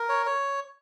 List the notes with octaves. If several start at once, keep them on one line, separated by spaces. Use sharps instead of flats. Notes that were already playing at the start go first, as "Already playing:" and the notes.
Already playing: A#4
C#5
C#5